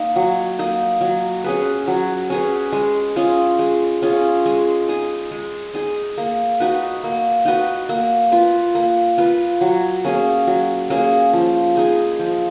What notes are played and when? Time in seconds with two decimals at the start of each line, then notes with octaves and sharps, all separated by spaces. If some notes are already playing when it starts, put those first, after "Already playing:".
Already playing: A#3 D#4
0.16 F#3
0.59 A#3 D#4
1.01 F#3
1.44 C#4 G#4 B4
1.88 F#3
2.30 C#4 G#4 B4
2.73 G#3
3.16 C#4 F4 G#4
3.59 G#3
4.02 C#4 F4 G#4
4.46 G#3
4.89 D#4 G#4
5.31 G#3
5.74 D#4 G#4
6.18 A#3
6.60 D#4 F#4 B4
7.04 A#3
7.45 D#4 F#4 B4
7.89 A#3
8.32 F4 B4
8.75 A#3
9.18 F4 B4
9.61 F#3
10.04 A#3 C#4 G#4
10.47 F#3
10.90 A#3 C#4 G#4
11.33 F3
11.76 G#3 D#4 G#4
12.19 F3